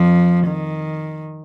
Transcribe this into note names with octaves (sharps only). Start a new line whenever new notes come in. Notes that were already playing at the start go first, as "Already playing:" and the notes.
Already playing: F2 F3
D#3